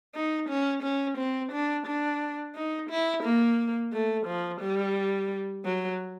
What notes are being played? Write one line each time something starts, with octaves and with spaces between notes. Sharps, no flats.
D#4
C#4
C#4
C4
D4
D4
D#4
E4
A#3
A3
F3
G3
F#3